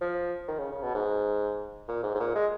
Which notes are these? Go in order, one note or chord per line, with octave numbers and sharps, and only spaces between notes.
F3
D#3
C#3
C#3
B2
G#2
A#2
G#2
G#2
A#2
G#3